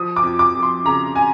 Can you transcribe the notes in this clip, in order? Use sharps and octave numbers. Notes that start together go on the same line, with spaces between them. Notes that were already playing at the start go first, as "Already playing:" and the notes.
Already playing: F3 D#6
D6
F2
D6
F2
C6
C#3 A#5
G#5